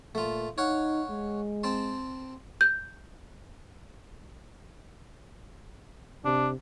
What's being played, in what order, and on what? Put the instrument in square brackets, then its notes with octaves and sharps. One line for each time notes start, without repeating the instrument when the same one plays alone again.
[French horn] A#2 [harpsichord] A3 F4
[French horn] D#4 [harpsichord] C#5 F5 F#5
[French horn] G#3
[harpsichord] C4 A5 C6
[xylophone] G6
[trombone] C3 [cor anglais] D4